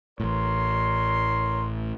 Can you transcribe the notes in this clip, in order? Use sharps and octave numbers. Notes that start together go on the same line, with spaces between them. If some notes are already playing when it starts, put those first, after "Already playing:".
A1 A2 A#4 C#5 C6